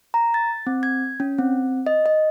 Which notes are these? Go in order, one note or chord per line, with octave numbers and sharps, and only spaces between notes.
A#5
A6
C4
G#6
C#4
C4
D#5
D#5